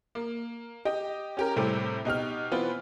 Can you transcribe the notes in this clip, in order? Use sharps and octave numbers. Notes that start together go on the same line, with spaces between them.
A#3
G4 D#5 G5
C#4 G4 A#4
A2 C3 G3 A3 C4 G4
B2 D#4 G4 F6
E3 B3 C4 F4 B4